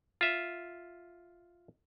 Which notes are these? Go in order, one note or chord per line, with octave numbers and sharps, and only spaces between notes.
F4 E5